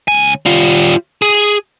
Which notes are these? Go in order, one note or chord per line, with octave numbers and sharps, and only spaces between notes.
C#2 G#5
G3 F4
G#4